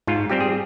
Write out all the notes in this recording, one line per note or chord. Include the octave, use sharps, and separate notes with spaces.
G#2 F4
G3 C4 G4
G#4